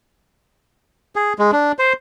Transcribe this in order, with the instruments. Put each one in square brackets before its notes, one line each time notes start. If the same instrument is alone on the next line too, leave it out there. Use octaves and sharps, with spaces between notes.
[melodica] G#4
G#3
D4
C5